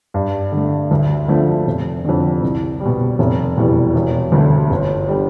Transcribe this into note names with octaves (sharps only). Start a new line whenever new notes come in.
G2
D3 A3
D2
D3 F3 A3
F1
F2 D3
C2
G3
B2
F1
E2 B2 G3
E1
D2 D3 A3 D4
G1
D3 G3